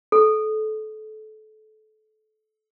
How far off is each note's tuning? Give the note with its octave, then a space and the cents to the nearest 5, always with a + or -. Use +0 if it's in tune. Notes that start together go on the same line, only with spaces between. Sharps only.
A4 -25